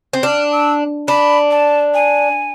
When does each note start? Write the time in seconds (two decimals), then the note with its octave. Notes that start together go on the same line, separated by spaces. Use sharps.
0.13 C4
0.23 D4 F6
0.52 E6
1.08 D4 B5
1.51 A5
1.94 G#5